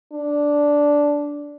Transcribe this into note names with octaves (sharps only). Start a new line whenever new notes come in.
D4